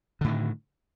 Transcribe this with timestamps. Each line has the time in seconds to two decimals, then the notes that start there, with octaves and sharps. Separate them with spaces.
0.21 D3
0.24 A2
0.28 D#3